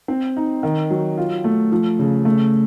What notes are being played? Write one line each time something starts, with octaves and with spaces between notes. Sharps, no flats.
C4
D#4
D#3
F#3
F4
A3
F3
C#3
A3